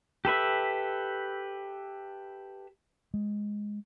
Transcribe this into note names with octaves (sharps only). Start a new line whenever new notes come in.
G4 A4 B4 E5
G#3